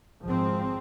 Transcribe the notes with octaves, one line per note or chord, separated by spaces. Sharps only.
G#1 F3 G#3 C4